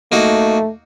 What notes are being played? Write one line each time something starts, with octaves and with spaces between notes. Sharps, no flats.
A3 A#3 D#4 F#4